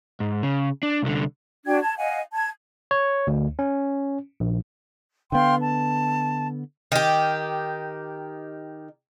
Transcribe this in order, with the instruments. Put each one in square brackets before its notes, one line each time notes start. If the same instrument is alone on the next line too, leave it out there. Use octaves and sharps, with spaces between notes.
[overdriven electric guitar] G#2
C#3
D4
C2 D3
[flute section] D4 F#4 G5 G#6
A5 G#6
D#5 F5 F#5 G#5
A5 G#6
[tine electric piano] C#5
D2
C#4
A#1
[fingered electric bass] D3 B3 [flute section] F5 G5 C6
[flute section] A5
[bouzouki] D#3 G4